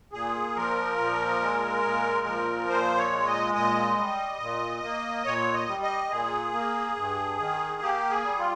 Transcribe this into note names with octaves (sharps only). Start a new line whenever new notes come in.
A#2 G#4
F3 A#4
A#2
G#3
A#2
F3
A#2 C5
C#5
G#3
D#5
A#2 D#5
G3
A#2
A#3
A#2 C#5
D#5
G3
D#5
A#2 G#4
A#3
G2
D#3
A#3 G4
G#4
G3
F4